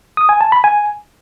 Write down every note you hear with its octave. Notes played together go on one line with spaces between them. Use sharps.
D#6
G#5
A5
B5
G#5